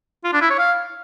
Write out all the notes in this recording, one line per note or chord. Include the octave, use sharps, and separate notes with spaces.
F4
D4
E4
C#5
F5